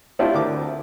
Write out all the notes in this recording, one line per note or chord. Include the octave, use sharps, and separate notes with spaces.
A3 C4 C#4 E4 F4 G4
D2 A#4 D6